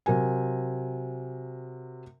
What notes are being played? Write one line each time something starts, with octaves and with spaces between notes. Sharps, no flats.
C3 F#3 A#4 G#5